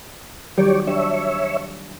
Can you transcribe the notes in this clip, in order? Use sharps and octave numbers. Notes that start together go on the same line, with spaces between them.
D#3 F#3 G3 G4 C#5 D5
D4 G4 C#5 E5